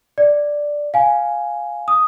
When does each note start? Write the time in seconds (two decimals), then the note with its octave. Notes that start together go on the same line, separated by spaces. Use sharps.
0.18 D5
0.94 F5 G#5
1.88 D#6